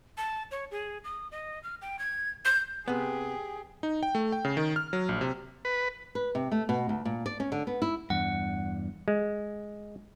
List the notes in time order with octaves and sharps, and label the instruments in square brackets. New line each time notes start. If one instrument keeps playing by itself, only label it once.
[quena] A5
C#5
G#4
D#6
D#5
F6
G5
G#6
G6
[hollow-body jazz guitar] C3 B3 [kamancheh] G4 G#4
[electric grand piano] D#4
G5
A3
G5
C#3
D#3
F6
F#3
A#1
C3
[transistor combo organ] B4
[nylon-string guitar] B4
C3
A3
B2
D2
A#2
D5
C#4
D3
B3
E4
[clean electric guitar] E2 G2 [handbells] F#5
[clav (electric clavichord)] G#3